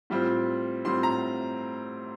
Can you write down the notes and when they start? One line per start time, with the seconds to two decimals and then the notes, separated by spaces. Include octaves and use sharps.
0.10 A2 G3 C4 F4
0.85 A2 G3 C4 F4 C6
1.03 A#5